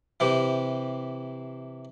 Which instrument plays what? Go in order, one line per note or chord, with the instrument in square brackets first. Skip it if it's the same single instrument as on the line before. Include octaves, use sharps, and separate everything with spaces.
[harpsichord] C3 E3 G4